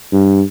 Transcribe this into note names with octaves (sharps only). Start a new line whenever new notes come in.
G2